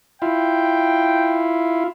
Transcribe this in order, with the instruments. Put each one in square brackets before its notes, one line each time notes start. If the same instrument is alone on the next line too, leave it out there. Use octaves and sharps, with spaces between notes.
[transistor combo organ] E4 F4 [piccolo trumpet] G5